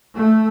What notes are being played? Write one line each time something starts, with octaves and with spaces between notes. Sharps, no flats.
A3